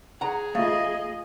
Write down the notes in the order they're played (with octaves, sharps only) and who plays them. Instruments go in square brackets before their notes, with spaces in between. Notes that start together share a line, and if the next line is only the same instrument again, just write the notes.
[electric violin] G#4 [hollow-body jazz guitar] F#5 A#5
[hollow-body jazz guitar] A3 [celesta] F4 F5 [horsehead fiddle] D#5